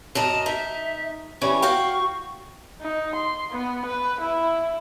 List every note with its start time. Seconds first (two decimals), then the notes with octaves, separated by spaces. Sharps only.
0.15 F#2 A#4 D#5 A5
0.46 D#4 E5
1.42 E3 G3 C#4 C#6
1.62 F#4 F5 G5
2.82 D#4
3.15 C6
3.51 B3
3.85 B4
4.20 E4